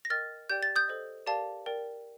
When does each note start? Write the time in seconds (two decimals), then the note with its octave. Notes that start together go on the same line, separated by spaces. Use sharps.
0.05 A#6
0.10 A#4 D#5 G5 F6 A6
0.50 G4 D5 G5 G6
0.63 A6
0.76 D#6 G6
0.88 A4 C5 D#5
1.27 G4 A#4 D5 F5 A5
1.66 A#4 D5 G5